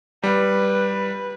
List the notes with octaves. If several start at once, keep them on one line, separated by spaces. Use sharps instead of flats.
G3 B4